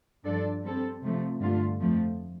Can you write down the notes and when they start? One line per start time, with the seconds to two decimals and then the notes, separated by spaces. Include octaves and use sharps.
0.24 G2 F3 D4 A4 D5
0.63 G3 C4 A4
1.02 C3 F3 A3
1.41 G2 D3 A3 F4
1.80 F2 F3 A3